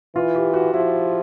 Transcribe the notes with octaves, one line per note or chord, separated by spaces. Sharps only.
E3 F4
G4
F#4
F3 E4